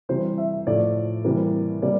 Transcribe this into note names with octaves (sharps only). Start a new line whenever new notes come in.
C3 E3 G3 C5
E5
A2 F3 A3 D5
C3 E3 G3 A#3
C3 G3 A#3 D5